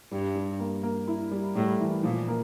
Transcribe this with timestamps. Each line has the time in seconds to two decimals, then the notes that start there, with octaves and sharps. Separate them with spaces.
0.12 G2 G3
0.35 G3
0.59 A#3
0.83 A#3
1.08 E4
1.31 G3
1.56 A2 G3
1.79 E3
2.03 A#2 F3
2.28 A#3